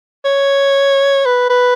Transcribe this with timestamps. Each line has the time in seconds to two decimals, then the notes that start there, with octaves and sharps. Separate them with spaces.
0.25 C#5
1.25 B4
1.50 B4